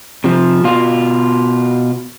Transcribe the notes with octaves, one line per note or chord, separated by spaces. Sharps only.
C3 F3
B2 F4